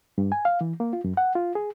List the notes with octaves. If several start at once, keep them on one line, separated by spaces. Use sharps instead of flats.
G2
G#5
F5
E3
A#3
F4
F#2
F#5
F4
G#4